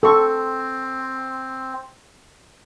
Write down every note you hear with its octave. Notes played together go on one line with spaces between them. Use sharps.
C4 A4 C#6